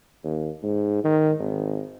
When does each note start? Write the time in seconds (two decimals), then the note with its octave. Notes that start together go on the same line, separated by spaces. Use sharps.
0.24 D#2
0.63 G#2
1.04 D#3
1.39 G#1